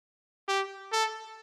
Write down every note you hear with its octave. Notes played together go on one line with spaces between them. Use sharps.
G4
A4